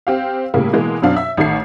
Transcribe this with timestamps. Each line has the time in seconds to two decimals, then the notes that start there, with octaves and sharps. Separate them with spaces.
0.07 C4 G4 F5
0.54 A2 C#3 G3 A#3
0.73 B2 E3 G#3 A#3
1.02 F#2 B2 C4 D4 F5
1.16 E5
1.37 A1 D#3 A3 C7